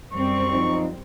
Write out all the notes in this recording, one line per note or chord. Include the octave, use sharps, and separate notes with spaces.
F#2 G3 C4 C#6
F3 D#4